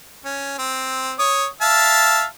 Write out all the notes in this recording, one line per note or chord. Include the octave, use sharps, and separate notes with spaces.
C#4
C4
C#5 D#6
E5 F5 A5